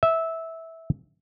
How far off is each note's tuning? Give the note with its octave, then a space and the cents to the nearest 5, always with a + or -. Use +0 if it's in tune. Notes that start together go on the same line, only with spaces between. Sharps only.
E5 -15